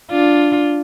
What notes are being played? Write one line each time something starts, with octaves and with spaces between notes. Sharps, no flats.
D4 F4